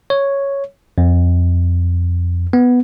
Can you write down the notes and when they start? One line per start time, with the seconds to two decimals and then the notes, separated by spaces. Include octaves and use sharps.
0.10 C#5
0.98 F2
2.53 B3